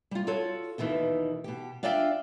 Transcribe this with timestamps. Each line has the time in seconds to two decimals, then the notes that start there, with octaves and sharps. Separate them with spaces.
0.11 G3 F4
0.27 F4 F#4 A4 C#5
0.78 D#2 B2 D#3 E3
1.44 B2 G4
1.83 D4 F4 D5 E5 F5 G5